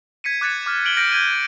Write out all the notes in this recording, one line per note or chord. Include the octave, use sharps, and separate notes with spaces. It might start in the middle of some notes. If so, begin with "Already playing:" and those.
G#6 B6 C#7 D#7
D6 F#6 G#6 A6 C#7
D6 F6
F6 D7 F#7 G7
F6 G6 A#6 B6 D7
G6 G#6 D#7